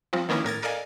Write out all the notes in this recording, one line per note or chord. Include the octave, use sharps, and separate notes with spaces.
F3 G3 C4 F4
D#3 A#3 B3 C#4 E4 A#4
A2 A#4 G#6 A6
A4 A#4 D5 D#5 F5 G#5